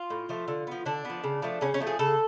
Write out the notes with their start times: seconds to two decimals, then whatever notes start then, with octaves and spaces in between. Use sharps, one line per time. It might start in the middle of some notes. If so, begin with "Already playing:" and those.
Already playing: F4
0.10 A2
0.29 F3 A3
0.48 D3
0.67 F3 B3
0.85 D3 D4
1.05 F3 B3
1.24 C#3
1.42 F3 A3
1.61 C#3 C#4
1.74 C#4
1.80 F3 A3
1.87 G#4
1.99 C#3 A4